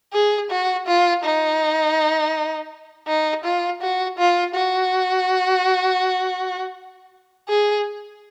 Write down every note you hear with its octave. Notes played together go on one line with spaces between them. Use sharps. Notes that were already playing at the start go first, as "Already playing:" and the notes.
G#4
F#4
F4
D#4
D#4
F4
F#4
F4
F#4
G#4